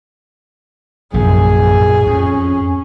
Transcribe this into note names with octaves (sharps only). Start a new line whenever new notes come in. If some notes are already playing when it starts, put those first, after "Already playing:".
A#1 F#2 C3 G#4
A#2
F2 C#4